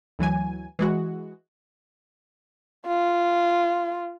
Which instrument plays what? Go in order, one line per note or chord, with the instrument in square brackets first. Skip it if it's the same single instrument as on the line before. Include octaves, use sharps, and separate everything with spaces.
[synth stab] D2 E3 F#3 G#5
E3 G#3 F#4
[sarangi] F4